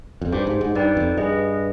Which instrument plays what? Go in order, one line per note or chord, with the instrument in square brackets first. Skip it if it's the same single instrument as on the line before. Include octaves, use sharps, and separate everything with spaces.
[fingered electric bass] F2
[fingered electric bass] G2 [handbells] G4 C5 G5
[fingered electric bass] G#2
G#2
[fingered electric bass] G2 [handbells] D#4 B4 D5 G5
[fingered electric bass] F2
[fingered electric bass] G2 [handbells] G#4 B4 D#5